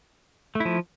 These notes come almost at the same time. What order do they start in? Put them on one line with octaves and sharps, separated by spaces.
A3 E4 F3